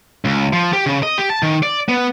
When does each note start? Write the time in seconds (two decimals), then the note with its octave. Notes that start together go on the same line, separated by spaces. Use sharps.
0.25 C#2
0.53 F3
0.73 G4
0.86 C#3
1.03 D#5
1.18 G4
1.30 A5
1.43 D#3
1.63 D5
1.89 B3